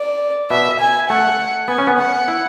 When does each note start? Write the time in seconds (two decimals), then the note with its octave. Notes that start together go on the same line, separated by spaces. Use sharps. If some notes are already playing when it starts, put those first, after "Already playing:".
Already playing: D5
0.51 B2 E5
0.80 G#5
1.09 A3 F#5
1.68 B3 G#5
1.78 C#4
1.87 B3
1.99 F#5
2.28 E4